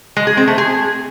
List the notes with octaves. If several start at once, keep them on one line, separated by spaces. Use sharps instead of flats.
G#3
G#4
C4
A3
G#4